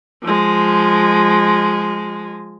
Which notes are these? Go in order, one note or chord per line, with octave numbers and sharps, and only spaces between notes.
F3 G#3